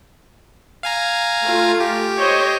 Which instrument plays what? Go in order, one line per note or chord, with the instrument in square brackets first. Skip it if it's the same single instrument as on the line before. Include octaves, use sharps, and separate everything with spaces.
[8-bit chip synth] F5 G#5 A#5
[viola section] A3 F4
[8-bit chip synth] G4
[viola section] C5 C#5 D#5